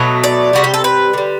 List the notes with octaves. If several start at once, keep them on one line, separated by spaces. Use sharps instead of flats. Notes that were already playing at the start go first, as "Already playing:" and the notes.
Already playing: B2 F#3 A3
D5
C3 E3 G3 F#4
G4
A4
B4
D3 G3